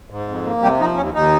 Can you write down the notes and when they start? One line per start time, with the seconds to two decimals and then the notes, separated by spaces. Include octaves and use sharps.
0.10 G#2
0.28 F2
0.45 A#3
0.62 C3 G3 G4
0.80 F3 D#4
0.97 D#2 C#4
1.14 D#2 D#4